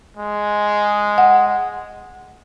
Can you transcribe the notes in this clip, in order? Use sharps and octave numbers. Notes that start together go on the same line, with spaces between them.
G#3
F#5